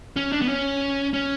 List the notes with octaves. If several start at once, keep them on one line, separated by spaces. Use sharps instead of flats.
C#4
D4
B3
C#4
C#4